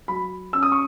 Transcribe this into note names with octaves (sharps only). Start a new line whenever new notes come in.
F#3 B5
C#4 E6
D#6
C#6